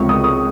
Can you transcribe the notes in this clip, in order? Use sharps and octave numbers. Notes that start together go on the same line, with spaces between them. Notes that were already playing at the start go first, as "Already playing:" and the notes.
Already playing: C#2 C3 F3 C#6
D#6
D#6